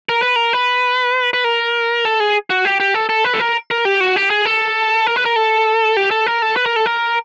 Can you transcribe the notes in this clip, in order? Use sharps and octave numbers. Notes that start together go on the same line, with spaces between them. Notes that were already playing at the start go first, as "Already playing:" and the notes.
A#4
B4
A#4
B4
B4
A#4
A4
G#4
F#4
G4
G4
A4
A4
B4
A4
A#4
A#4
G4
F#4
G4
G#4
A4
A#4
B4
A#4
A4
G4
A4
A#4
A4
B4
A#4
A4
A#4